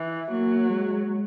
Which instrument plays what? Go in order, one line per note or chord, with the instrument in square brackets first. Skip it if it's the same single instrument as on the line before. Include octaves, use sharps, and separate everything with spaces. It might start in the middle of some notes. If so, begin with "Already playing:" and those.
Already playing: [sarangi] E3
[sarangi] F#3 [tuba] A#3
[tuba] G#3